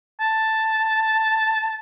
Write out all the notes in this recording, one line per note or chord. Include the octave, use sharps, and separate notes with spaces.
A5